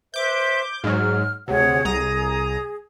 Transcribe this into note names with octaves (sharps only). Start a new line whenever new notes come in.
B4 C5 E5 D6 G6
G#2 F#3 F6
D2 C3 G#4 C#5 F#5
C2 G#4 A#5 D#6